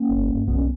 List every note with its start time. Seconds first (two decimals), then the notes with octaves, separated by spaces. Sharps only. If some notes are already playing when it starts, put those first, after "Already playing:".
Already playing: A#3 C#4
0.09 G1
0.28 G2
0.47 B1 B3
0.54 C#4